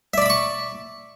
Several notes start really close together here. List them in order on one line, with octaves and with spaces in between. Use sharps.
E5 D5 B5 D6 C#6